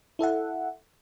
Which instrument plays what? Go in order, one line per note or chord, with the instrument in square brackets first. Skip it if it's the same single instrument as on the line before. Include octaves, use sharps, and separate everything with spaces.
[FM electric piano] E4 A4 E5 F#5